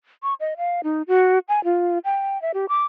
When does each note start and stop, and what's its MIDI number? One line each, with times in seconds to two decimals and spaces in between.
0.23 0.34 85
0.40 0.54 75
0.57 0.81 77
0.84 1.02 63
1.08 1.39 66
1.49 1.63 80
1.64 1.99 65
2.05 2.41 79
2.42 2.52 76
2.54 2.66 67
2.69 2.85 86